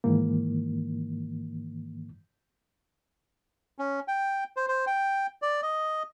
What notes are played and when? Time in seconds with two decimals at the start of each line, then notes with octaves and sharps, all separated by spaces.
0.04 G#2 D#3 E3 A#3
3.78 C#4
4.08 G5
4.57 C5
4.68 C5
4.87 G5
5.42 D5
5.62 D#5